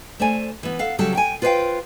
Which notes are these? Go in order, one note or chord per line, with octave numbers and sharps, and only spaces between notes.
A3 C5 D5 G#5
E3 B3
A4 F5 F#5
C#3 F#3 G3 G4 A4
G5 G#5
F4 B4 C5 D5 F5 G5